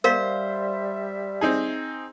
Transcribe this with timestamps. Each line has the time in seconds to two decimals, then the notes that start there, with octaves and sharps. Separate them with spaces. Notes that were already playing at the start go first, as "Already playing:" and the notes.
0.04 G3 A#4 C5 E5 F5
1.41 C4 D#4 G#4